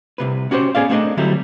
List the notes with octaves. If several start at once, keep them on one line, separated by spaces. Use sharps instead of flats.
C2 C3 B4
C#4 F#4 G4 B4 C5
B3 C#4 G#4 D5 F5
A3 B3 C4 D4 A#4 D#5
D3 F#3 G3 A3 C4 E4